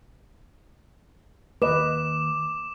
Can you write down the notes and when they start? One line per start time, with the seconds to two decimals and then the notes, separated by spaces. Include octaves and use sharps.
1.62 D#3 A#3 B4 D#5 D6 E7